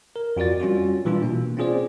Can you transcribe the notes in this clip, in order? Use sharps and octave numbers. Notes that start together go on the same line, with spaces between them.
A#4
F2 F4 F#4 D5 A6
G3 C#4 F4 F#4
A#2 E3 G3 D4 F4
B2 A#3
C4 C#4 F4 G#4 C5 D5